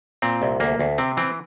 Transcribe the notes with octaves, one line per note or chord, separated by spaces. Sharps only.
A#2 C4
C2
D2 A#3
D2
C3 C4
E3 C4